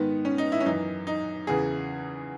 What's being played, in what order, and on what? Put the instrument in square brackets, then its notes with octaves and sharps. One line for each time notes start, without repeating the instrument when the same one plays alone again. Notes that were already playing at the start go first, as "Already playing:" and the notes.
Already playing: [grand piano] G#2 D#3 B3
C#4
D#4
E4
C#4
F#2 E3 D#4
D#4
E2 C#3 E3 G#4